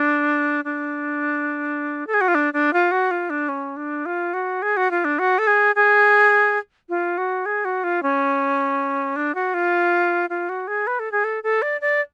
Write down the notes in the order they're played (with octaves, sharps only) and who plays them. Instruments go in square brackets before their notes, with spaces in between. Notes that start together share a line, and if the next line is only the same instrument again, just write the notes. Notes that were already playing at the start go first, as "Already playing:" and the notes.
Already playing: [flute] D4
D4
A4
G#4
F#4
F4
D4
D4
F4
F#4
F4
D4
C#4
D4
F4
F#4
G#4
F#4
F4
D4
F#4
A4
G#4
G#4
F4
F#4
G#4
F#4
F4
C#4
D4
F#4
F4
F4
F#4
G#4
B4
A4
G#4
A4
A4
D5
D5